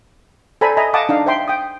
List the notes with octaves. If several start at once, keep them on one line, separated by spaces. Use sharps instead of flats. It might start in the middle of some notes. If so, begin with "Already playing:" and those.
A4 C5 D5 G#5 A#5 B5
D#5 E5 G#5 A#5 B5
D#5 F5 F#5 A5 D6 D#6
D4 D#4 F5
C5 E5 G5 C6
G5 D#6